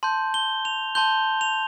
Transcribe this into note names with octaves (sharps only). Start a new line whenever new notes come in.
A5 C6 G6
G7
F7
A5 C6 G6 G7
F7